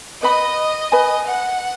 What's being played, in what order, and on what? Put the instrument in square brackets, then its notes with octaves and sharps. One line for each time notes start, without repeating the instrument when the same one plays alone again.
[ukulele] B4 F#5 B5 [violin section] D#5
[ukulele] B4 G#5 B5
[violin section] F#5